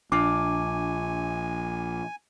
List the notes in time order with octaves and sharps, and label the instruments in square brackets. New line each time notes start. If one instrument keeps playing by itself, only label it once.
[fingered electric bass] A#1 [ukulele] D4 F4 [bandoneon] G#5 [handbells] D6